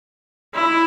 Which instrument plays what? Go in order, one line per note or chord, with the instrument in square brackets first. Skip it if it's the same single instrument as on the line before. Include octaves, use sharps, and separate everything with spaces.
[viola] E4